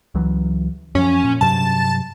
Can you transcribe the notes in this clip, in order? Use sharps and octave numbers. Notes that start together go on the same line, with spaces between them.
C#2 E3 F#3
F#2 F3 C#4
A#2
G2 C3 F#3 A5